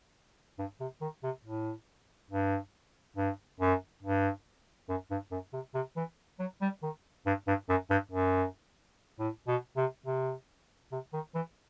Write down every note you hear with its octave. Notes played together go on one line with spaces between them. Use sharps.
G2
C3
D#3
C3
A2
G2
G2
F#2
G2
F#2
G2
F#2
C3
C3
E3
F#3
G3
D#3
G2
G2
F#2
G2
F#2
A2
B2
C3
C3
C3
D#3
E3